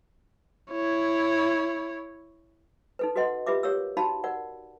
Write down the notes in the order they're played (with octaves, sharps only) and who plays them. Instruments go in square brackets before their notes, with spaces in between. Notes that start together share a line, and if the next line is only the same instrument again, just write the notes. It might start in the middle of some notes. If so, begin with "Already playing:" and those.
[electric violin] E4 C#5
[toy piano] D#4 A4 B4
F#4 A4 B4 D#5 F#5 C6
F4 G4 B4 E5 D6
G4 A#4 C#5 F5 D#6 E6
D#4 F#4 F5 A5 B5
A#4 D5 F#5